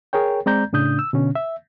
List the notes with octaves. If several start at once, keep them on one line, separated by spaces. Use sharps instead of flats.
G#4 A#4 C#5 G5
G#3 C4 D5 A#5 G6
A2 C#3 D4 D#6 G6
E6
B2 D3 C#4
E5